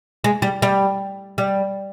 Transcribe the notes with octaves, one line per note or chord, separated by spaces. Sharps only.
G#3
G3
G3
G3